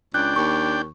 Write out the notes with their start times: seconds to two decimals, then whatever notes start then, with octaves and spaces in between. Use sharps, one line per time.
0.14 C#2 D4 G5 F#6
0.36 D#2 C#6